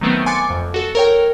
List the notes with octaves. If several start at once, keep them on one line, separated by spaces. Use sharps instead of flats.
D#3 F#3 A3 B3 C4
G#5 C6 D6 F#6 A6 C#7
F2
F#4 A4
A#4 C#5 G5